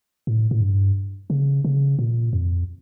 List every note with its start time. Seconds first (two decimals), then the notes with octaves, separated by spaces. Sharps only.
0.27 A2
0.51 A2
0.61 G2
1.30 C#3
1.65 C#3
1.99 A#2
2.33 F2